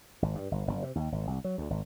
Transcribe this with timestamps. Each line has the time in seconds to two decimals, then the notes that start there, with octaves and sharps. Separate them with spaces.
0.22 G#1
0.35 G2
0.51 G1
0.67 F#1
0.83 C3
0.95 D#2
1.12 G#1
1.27 C2
1.44 F#3
1.58 D2
1.70 G#1